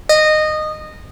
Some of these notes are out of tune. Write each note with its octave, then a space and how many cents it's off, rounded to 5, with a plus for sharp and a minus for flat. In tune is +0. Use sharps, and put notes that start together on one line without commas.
D#5 -15